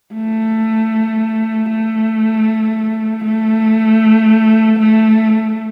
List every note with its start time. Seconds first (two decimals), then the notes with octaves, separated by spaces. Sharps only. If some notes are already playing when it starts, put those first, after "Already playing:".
0.14 A3
1.70 A3
3.24 A3
4.79 A3